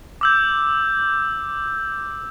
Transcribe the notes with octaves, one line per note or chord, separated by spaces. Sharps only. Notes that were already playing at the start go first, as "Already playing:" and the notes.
D6 E6 G6